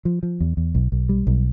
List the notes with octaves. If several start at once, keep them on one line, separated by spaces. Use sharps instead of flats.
F3
F3
E2
E2
B1
B1
G3
B1